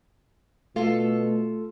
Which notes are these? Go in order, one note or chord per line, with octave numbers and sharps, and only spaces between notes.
B2 A3 F4 A4